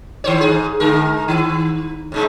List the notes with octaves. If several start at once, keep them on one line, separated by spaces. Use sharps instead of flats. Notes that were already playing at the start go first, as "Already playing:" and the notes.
D#3 C5 C#5
G#2 G#4
D3 G#3 A#4
D#3
G#2 C#3 G#3